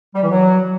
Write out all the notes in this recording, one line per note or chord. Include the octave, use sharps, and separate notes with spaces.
G3
E3
F#3